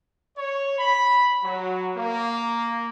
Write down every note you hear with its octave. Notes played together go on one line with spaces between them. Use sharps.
C#5
B5
F#3
A#3